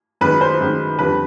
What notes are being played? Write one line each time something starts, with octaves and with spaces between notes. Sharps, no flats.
F#2 D#3 G#3 B4
C5
F#2 D#3 G#3
F2 D3 G3 B4